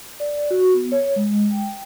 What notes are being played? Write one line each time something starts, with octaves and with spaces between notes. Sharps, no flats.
D5
F#4
B3
C#5
G#3
G5